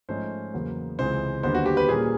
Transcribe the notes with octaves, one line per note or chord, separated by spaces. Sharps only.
G#2 F3 A3 C#4 C5
E2 C#3 F#3 A#3
C#2 C3 E3 G#3 C5
D#2 D3 G3 B3 C5
F#4
G4
B4
A#2 G3 A#3 C#4 G#4